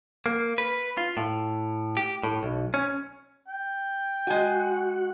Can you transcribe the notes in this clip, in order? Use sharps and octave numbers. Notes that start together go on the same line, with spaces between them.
A#3
B4
F4
A2
G4
A2
B1
C#4
G5
G#3 F#4 F#5 G#5